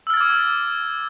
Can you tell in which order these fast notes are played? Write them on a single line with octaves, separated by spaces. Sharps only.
E6 F6 A6 G#6 D6